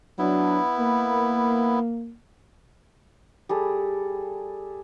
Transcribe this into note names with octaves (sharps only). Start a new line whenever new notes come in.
F#3 B3 D4 E4
A#3
G3 G#4 A4